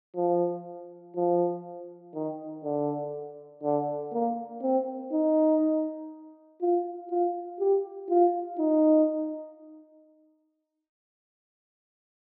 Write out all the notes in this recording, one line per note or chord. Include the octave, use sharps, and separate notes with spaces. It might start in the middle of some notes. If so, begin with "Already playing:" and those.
F3
F3
D#3
D3
D3
A#3
C4
D#4
F4
F4
G4
F4
D#4